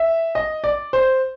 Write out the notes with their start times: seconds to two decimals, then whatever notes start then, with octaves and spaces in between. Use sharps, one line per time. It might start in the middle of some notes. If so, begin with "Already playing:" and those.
Already playing: E5
0.35 D#5
0.64 D5
0.93 C5